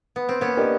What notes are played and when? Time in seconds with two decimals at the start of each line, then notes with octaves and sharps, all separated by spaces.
0.16 B3
0.29 C4
0.41 A#3 B3 C#4
0.57 D4 G4 A#4 D#5